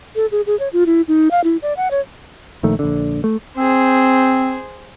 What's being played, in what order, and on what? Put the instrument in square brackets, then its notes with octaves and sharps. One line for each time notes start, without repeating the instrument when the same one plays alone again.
[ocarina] A4
G#4
G#4
C#5
F4
E4
D#4
F5
E4
D5
F#5
C#5
[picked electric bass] A#1 D#3 A3
A#1 D3
A3
[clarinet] C4 [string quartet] G#4 C5